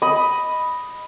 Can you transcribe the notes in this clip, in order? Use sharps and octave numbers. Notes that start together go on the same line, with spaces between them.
D#5 B5